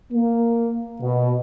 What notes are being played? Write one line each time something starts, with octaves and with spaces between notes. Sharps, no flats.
A#3
B2